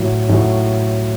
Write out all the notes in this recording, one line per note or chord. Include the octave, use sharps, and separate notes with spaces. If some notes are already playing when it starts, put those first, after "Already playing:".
Already playing: A2 F#3
A2 F#3